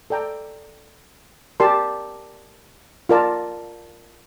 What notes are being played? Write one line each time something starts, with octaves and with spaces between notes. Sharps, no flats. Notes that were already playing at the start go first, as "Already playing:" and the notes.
A4 D5 G5 A#5
G4 A#4 D5 A5 C6
F4 A#4 D5 A5